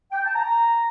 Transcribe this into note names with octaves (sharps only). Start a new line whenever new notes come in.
G5
A5
A#5